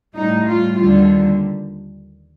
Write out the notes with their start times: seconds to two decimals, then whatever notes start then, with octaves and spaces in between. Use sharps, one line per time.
0.16 A2 G3 D#4
0.47 F4
0.77 D#2 D3 G3 F4